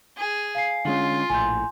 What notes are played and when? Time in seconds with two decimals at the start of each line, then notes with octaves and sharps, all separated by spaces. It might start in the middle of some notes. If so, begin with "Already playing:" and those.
0.17 G#4
0.55 F5 G#5 C7
0.85 D3 G#3 C#4 F4
1.30 A#1 A2 G#5 C6 G6